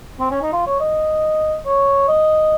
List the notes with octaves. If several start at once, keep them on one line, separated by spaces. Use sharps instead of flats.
C4
C#4
D#4
F4
C#5
D#5
C#5
D#5